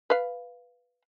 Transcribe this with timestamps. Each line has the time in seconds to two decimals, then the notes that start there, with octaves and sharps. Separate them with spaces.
0.10 B4 F5